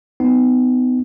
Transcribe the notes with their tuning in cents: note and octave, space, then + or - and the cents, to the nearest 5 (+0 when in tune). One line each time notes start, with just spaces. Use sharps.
B3 +35 D#4 +0